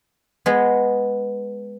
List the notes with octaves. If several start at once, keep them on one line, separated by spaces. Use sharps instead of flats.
G#3 B3